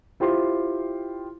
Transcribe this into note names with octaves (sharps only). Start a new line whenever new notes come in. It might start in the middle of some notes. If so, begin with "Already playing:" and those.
E4 F4 G4 C5 C6